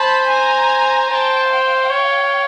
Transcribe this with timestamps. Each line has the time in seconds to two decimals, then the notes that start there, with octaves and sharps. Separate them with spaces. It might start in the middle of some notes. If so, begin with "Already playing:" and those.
Already playing: C5 A5 B5
0.30 G#5 A#5
1.10 C5 G5 A5
1.50 F5 G5
1.90 C#5